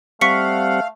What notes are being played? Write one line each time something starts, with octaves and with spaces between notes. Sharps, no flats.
G3 A3 C4 F5 F#5 C#6 B6 C#7